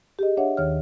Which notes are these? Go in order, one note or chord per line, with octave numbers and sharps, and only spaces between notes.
G4 G#4 D#5
D4 C#5 E5 F#5
D#2 D#3 C#5 F6